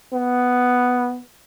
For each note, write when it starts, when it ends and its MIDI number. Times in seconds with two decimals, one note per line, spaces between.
0.13 1.19 59